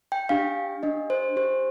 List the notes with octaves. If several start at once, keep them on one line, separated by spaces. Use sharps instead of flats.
G5
D4 G4 F5
D4 G4 D#5
C5
D4 G4 C5